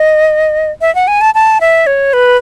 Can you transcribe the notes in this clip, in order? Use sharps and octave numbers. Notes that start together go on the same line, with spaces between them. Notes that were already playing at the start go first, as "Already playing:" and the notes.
Already playing: D#5
E5
F#5
G#5
A5
A5
E5
C#5
B4